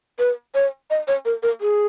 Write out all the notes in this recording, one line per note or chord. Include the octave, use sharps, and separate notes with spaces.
B4
C#5
D#5
C#5
A#4
A#4
G#4